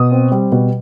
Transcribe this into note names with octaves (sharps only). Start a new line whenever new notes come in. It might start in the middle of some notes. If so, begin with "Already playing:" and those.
Already playing: B2 D#6
C4
G3
B2